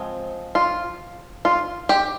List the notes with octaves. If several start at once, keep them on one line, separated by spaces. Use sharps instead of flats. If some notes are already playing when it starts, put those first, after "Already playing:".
Already playing: F3 G#3 C4
F4
F4
G4